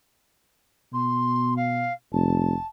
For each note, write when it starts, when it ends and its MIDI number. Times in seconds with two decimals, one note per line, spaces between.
0.93 1.88 47
0.93 1.54 84
1.56 1.92 77
2.12 2.54 29
2.12 2.66 81